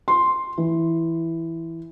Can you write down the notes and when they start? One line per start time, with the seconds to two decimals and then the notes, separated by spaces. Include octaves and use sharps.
0.08 C6
0.58 E3